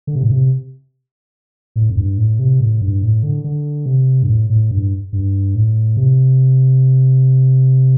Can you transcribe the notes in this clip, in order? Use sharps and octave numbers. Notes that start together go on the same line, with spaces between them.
D3
C3
A2
C3
A2
F2
G2
A2
C3
A2
G2
A2
D3
D3
C3
G2
A2
A2
G2
G2
A2
C3